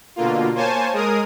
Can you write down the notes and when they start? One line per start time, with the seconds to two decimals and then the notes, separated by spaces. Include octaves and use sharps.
0.16 B2 D3 A#3 F4
0.55 A#3 C5 C#5 G#5 A5
0.92 G#3 G#4 A#4 D#6